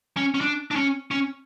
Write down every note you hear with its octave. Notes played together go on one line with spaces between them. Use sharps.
C#4
C#4
D4
D4
C#4
C#4